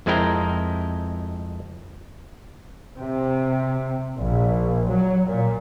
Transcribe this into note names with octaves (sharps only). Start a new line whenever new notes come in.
F2 G#3 C4 E4 A#4 G5
C3
A#1
F#3
A#2